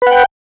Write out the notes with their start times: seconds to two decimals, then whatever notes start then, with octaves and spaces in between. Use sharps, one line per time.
0.02 B4
0.07 F#5
0.11 G5